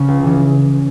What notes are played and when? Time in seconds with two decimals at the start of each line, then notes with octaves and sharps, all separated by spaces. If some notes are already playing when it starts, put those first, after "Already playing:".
Already playing: C#3 C#4
0.08 C#2
0.23 C#3 E3